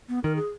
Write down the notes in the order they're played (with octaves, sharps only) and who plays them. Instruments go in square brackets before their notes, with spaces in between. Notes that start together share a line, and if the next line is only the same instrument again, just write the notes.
[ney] B3
[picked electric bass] D#3 [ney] A#4
[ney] G#4